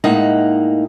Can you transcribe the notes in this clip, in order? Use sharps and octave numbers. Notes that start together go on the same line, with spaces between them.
A2 G#3 A#3 D#4 F#5